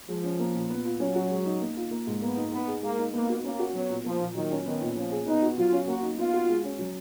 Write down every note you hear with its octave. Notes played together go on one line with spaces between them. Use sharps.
F3 G#3
C#4
A#3
A#2
B3
F4
F#3 C#4
F#4
G#3
D#4
A#3
F4
A#3
G#2
A#3 B3
D#4
B3 D#4
G#4
G#3 A#3
D#4
A#3 B3
F#4
A#3 C#4
F#4
F#3 B3
A#2
F3 A#3
A#2
D#3 F#3
C#4
D#3 B3
A#2
F3 C#4
G#4
B3 D#4
F#4
F#3 F4
C#4
A#3 F#4
D#4
B3 F4
F#4
G#3
C#4
F#3